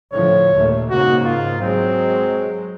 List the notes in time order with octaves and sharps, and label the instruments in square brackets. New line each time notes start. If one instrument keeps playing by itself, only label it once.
[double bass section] A2 D3 F3 [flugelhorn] C#5
[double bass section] D#2 A#2 A3
[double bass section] G#2 C#3 A#3 [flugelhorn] F#4
[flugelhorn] F4
[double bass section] F#3 G#3 [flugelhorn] C4